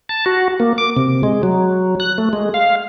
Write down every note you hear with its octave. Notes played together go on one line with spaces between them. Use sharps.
A5
F#4
A#3
D6
C3
G#3
F#3
F#6
A3
G#3
F5